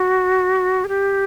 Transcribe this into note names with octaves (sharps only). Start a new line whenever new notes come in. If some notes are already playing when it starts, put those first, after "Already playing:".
Already playing: F#4
G#4
G4